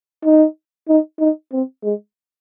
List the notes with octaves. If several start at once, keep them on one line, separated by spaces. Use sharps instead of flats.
D#4
D#4
D#4
C4
G#3